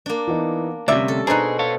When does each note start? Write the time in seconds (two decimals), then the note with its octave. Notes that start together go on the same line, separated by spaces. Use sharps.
0.06 A#3 D4
0.27 E3 B3 D#4
0.88 D2 C3 G3 C#4 D5 E5 D6
1.08 A4
1.27 B2 D4 D#4 G#4 C5 A#5 F#6
1.59 A4 C#5 F5